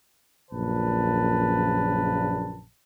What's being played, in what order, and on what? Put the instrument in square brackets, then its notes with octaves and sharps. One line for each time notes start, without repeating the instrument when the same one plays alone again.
[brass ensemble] A#1 F#2 A#2 C#3 B4 A5